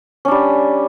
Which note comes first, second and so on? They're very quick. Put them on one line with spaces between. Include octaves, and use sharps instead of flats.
C#4 D4 G3